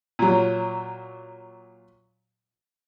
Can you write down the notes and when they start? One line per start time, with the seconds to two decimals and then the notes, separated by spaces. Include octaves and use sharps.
0.19 A#2 F#3